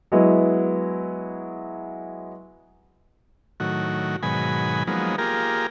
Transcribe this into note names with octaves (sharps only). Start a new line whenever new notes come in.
F#3 G#3 B3 E4
A2 D#3 F#3 F#4
G#2 B2 D#3 F#3 G#5 B5
F3 F#3 G#3 A#3 B3 D#4
A#3 F4 G4 G#4 A#4